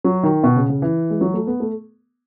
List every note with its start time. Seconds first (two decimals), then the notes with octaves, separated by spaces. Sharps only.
0.04 F#3
0.23 D#3
0.43 B2
0.56 C#3
0.69 C#3
0.82 E3
1.10 G#3
1.21 F#3
1.34 A3
1.47 B3
1.60 A3